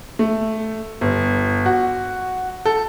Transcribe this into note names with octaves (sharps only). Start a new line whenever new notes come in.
A3
G1
F#4
A4